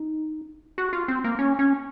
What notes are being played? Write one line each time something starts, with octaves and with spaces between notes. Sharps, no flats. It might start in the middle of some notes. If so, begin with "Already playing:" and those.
Already playing: D#4
F#4
F4
C4
A#3
C#4
C#4